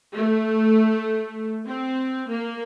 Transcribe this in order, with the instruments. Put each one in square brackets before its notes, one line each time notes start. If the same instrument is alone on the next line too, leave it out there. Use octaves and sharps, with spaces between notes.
[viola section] A3
C4
A#3